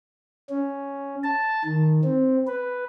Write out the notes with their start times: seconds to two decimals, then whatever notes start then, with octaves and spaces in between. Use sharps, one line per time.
0.49 C#4
1.24 A5
1.64 D#3
2.04 C4
2.47 B4